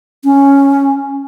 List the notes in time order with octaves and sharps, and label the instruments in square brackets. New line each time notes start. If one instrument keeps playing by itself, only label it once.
[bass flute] C#4